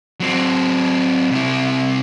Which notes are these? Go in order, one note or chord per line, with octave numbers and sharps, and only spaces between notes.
F#3 C4
C3 E4